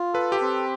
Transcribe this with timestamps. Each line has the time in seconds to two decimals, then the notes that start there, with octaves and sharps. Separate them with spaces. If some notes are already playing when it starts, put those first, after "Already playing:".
Already playing: F4
0.14 A4 B4
0.32 G4
0.42 C4